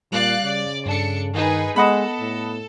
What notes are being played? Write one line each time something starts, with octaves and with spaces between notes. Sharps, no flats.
A#2 G3 D5 F5 F#6
C#3 D5
G2 D4 A4 C#7
D#3 D#4 G#4 B4
G#3 B3 A4 D#5 F#5 B5
A2